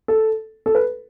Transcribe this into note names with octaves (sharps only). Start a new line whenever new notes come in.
A4
A4
B4